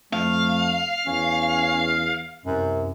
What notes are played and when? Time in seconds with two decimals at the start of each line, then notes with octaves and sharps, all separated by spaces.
0.13 F2 A3 F5
1.07 E2 C#4
2.46 C2 F#2